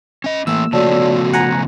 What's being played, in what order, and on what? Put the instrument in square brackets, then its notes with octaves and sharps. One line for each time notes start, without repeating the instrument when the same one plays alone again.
[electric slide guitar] C#4 D#5
[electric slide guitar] E3 A3 [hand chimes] A#3 [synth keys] E6
[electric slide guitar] C#3 F3 A3 [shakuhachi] F#4 [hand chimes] C#5 D5 A5
[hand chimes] B3
[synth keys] F#5 G#5 A#5